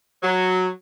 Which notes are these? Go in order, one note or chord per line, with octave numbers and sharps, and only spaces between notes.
F#3